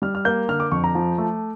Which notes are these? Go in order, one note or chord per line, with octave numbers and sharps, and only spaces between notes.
G3 F6
F6
A#3 G6
D3 F6
D6
F2 C#6
A#5
F3
A3